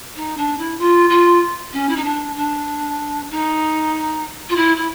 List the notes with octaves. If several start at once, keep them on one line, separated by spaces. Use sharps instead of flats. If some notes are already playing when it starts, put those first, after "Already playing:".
D#4
D4
E4
F4
F4
C#4
E4
D#4
D4
D4
D#4
F4
E4
E4